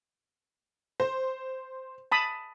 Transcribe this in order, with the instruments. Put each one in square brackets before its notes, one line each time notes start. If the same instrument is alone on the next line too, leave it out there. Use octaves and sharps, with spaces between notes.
[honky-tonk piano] C5
[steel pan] A5 B5 D#6